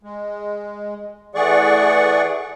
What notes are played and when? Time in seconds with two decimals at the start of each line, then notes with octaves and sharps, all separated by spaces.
0.03 G#3
1.35 E3 A3 G#4 D5 F#5 C#6